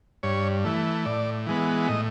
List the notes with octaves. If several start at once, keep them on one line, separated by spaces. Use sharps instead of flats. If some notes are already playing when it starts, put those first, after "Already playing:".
G2 C#5
E3 A3
A2 D5
E3 G#3 B3
A2 D#5